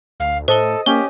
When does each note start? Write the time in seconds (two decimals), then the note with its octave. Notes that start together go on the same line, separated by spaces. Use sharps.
0.20 D2 F5
0.48 A2 A4 C5 D#5 G7
0.86 A#3 C#4 G4 G7